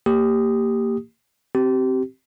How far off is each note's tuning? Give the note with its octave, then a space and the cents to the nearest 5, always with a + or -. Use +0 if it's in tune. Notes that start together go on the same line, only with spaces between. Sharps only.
A#3 -20 G4 +0 D#6 +0
C4 +0 G4 -30